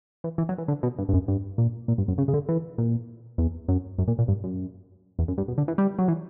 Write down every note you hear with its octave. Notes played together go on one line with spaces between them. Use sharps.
E3
E3
F#3
E3
D3
B2
G2
G2
F#2
G2
A#2
A#2
G2
F#2
C#3
C#3
D3
E3
A#2
E2
F#2
F#2
A#2
A#2
G2
F#2
E2
F#2
G2
B2
D3
E3
G3
F#3
E3